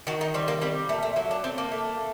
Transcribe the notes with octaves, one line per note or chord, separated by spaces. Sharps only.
D#3 F#4
D#4
G3 C4
A#3
G3 C4
A#2 A3
A3
F#3 A#3
D4
A3 C4
A#3
A3